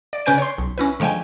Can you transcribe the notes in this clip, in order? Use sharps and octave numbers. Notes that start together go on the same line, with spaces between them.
D5
C#3 C#4 B4 G#5 G6 D7
C#5 C6
B1
C#4 E4 B4
D3 F3 G#3 G5 G#5